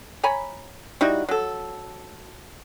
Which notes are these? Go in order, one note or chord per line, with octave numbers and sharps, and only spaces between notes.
C#5 G#5 A#5 B5
G3 D#4 E4 F#4
F#3 A4